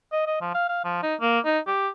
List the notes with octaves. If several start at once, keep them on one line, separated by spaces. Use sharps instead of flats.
D#5
D#5
F3
F5
F5
F3
D#4
A#3
D#4
G4